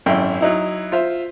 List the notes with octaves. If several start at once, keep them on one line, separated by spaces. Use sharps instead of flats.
G#1 F#2 E4 G5
F#3 D#4 E4
F4 C5 E5